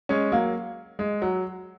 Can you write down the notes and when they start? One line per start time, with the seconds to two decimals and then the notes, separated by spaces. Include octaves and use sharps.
0.09 G#3 C#4
0.32 F#3 A#3
0.99 G#3
1.22 F#3